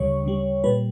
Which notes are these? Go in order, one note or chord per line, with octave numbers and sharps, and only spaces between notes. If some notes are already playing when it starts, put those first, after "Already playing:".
Already playing: D2 C#3 G3 C#5
D2 C#3 G3
A#2 G3 B4